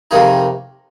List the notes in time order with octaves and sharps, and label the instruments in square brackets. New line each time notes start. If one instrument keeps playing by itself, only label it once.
[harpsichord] F2 C3 D#3 A#3 D#4 G#4